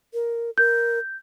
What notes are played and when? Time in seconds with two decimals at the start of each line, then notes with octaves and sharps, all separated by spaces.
0.14 A#4
0.58 A#4 G6